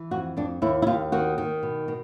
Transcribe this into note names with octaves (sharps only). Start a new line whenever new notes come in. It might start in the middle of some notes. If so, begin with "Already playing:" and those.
Already playing: E3
F2 F#4
F2 D4
D#2 E4
E4
D#2 F4
D#3 F#4
D#3
B2
B2